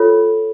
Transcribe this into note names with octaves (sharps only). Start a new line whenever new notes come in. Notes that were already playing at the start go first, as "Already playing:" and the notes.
Already playing: F4 A4 C#5